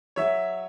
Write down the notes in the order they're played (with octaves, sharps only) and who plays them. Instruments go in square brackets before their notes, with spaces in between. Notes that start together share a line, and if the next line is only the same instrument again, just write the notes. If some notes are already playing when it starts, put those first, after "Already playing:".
[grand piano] F#3 C#5 E5